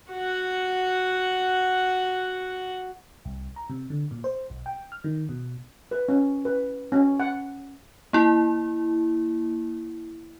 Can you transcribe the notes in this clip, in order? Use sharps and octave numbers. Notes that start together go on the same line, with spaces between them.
F#4 F#5
C2
A#5
C3
D3
A#2
C5
B1
G5
F6
D#3
B2
B4
C#4
B4
C#4
F#5
A#3 E4